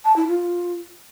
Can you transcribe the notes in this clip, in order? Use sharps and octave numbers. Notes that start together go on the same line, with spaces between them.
A5
E4
F4